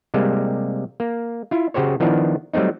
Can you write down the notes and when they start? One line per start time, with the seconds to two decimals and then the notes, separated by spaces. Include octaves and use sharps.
0.14 C3 G3 G#3 A#3
1.00 A#3
1.51 E4 F4
1.74 C#3 F#4 G4 C5 C#5
2.00 D#3 F3 B3 D4 E4
2.54 F#3 G3 A3 C4 D#4